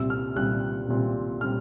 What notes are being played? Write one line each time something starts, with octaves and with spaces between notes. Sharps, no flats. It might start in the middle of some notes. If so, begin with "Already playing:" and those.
Already playing: C2 A#2 G3 C4 E6
F6
C2 A#2 G3 C4 F#6
C2 A#2 G3 C4
A#2 G3 C4 F6